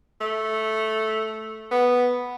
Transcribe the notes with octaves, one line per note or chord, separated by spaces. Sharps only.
A3
B3